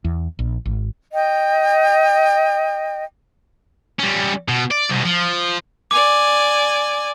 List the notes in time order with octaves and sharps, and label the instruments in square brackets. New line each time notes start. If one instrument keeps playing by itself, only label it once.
[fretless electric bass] E2
A#1
G#1
[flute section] D#5 G5
[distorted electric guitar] G3 C#4
B2
D5
C2 B2
F3
[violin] D5 G#5 [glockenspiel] D6